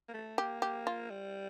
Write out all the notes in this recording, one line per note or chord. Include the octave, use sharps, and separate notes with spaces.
A#3
A3
A#3 G4
G4
F4
G3